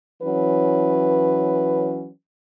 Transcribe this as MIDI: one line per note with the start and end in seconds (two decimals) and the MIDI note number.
0.23 2.09 52
0.23 2.09 54
0.23 2.09 61
0.23 2.09 71